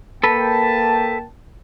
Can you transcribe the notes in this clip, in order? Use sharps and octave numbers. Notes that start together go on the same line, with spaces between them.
A#3 A4 B4 G5 A5